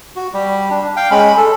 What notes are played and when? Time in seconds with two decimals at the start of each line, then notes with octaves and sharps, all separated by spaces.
0.16 F#4
0.34 G3 G4
0.70 D4
0.96 F5 G5
1.11 G#3 C#4 B5
1.37 A4